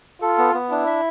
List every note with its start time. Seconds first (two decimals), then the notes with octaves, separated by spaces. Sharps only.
0.22 F4 A4
0.38 B3
0.54 B3
0.71 D4 E4
0.87 E5